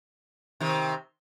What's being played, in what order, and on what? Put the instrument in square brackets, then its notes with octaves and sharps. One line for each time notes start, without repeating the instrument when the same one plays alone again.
[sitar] C3 D#3